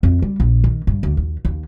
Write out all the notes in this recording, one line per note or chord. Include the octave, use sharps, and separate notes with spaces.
F2
G3
A#1
D#3
G2
D2
D#2
D#2